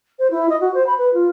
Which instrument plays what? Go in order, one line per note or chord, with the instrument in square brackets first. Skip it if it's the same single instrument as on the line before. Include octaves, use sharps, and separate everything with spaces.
[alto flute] C5
E4
D#5
F#4
C5
B5
B4
F4